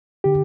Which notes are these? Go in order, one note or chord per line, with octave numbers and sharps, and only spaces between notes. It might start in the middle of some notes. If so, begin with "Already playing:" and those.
D3 G4